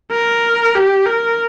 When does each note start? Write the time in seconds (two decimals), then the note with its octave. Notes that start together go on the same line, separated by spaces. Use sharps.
0.12 A#4
0.75 G4
1.06 A#4